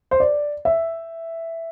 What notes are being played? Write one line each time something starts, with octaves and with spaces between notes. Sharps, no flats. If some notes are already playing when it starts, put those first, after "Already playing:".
C5
D5
E5